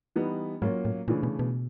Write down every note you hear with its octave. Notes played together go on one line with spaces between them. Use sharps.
E3 G3 B3 D#4
G#2 F#3 A#3 C#4 F4
A2
A#2 C#3 E3 A3 D4
B2
B2